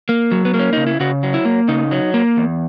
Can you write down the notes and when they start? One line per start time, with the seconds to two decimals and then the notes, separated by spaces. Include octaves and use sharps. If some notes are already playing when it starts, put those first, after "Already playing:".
0.09 A#3
0.32 F#3
0.45 B3
0.54 A#3
0.59 C#4
0.73 C#3 D#4
0.87 E4
1.00 C#3 F#4
1.23 F#3
1.34 E4
1.45 A#3
1.68 C#3 D#4
1.91 F#3
2.14 A#3
2.37 E2